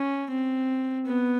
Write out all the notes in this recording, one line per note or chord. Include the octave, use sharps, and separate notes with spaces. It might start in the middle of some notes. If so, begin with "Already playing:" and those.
Already playing: C#4
C4
B3